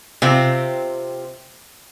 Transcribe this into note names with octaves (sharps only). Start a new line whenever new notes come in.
C3 C4 F4